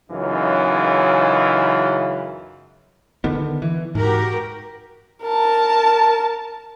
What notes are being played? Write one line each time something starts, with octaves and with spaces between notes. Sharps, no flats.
C#2 F#2 C#3 E3 D#4 F4
D3 D#3 B3
E3
G#2 F#4 G4 A#4
A#4 A5